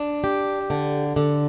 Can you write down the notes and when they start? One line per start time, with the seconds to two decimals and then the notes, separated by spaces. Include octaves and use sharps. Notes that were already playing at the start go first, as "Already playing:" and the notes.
Already playing: D4
0.24 G4
0.70 D3
1.16 D3